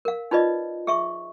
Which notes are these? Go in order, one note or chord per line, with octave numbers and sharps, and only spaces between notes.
A#4 F5
D#4 F4 B4 D5 D#5
G#4 E5 C#6